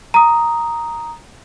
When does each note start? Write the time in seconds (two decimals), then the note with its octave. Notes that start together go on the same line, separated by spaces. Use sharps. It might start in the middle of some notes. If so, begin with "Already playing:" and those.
0.14 A#5 D#6